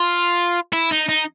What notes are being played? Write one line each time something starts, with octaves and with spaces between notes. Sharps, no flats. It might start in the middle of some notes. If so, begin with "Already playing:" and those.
Already playing: F4
E4
D#4
D#4